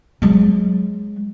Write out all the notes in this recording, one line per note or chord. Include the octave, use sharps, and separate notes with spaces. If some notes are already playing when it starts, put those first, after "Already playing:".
F#3 G#3